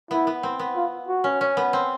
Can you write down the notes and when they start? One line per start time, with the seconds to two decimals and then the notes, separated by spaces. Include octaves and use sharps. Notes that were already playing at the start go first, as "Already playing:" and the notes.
0.11 B3 E4
0.27 B3
0.43 C4
0.59 B3
0.76 F4
1.08 F#4
1.24 C#4
1.41 C#4
1.57 B3
1.73 C4